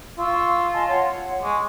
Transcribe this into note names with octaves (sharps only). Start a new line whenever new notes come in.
F4 C#6 E6
D#5 G#5 A5
C#5 F#5
G#3 C#6 D6